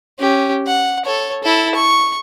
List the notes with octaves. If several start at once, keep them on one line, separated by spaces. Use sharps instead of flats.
C#4 G4
F#5
A4 C#5
E4 A4
C#6